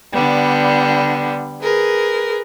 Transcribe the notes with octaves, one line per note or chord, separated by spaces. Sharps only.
D3 G3 B3
G#4 A#4 B4